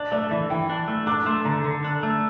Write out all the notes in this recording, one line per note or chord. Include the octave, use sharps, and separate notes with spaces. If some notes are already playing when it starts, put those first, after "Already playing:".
Already playing: D4 D5
A3 D5
E3 E5
E3 G5
D4
A3
D4 D6
A3 C6
D3 A#5
D3
D4
A3